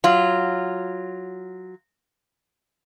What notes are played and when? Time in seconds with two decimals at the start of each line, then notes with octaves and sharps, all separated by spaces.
0.04 F#3 F4